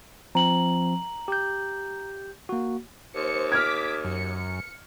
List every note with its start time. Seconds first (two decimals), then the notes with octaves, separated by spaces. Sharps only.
0.35 F3 C4 A#5 F#7
1.28 G4 G6
2.49 A#3 F#4
3.15 D#2 C5 C#7
3.52 D6 F6 G#6 B6
4.05 F#2 C#7